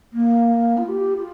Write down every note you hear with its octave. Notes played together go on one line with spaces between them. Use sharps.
A#3
F4
G4
F4